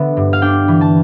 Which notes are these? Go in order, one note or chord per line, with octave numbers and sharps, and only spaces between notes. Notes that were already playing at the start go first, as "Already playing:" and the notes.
Already playing: D3 B3 E5
G2
F5
D4 G5
E3
A5